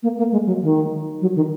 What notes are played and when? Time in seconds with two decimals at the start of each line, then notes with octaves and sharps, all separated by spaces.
0.03 A#3
0.18 A#3
0.32 G#3
0.46 F#3
0.62 D#3
1.21 F#3
1.36 D#3